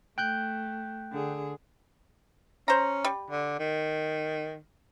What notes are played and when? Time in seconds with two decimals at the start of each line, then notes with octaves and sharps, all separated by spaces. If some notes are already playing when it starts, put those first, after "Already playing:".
0.18 A3 G5 F#6 G6
1.12 D3 G#4
2.68 C#4 C5 A#5
3.05 G3
3.30 D3
3.59 D#3